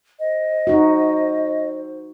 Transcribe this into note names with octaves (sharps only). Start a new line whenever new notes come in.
C5 D#5
D#4 F#4